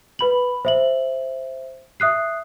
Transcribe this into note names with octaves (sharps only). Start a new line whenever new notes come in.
B4 B5 F#7
C5 E5 F#7
E5 D#6 F#6 C7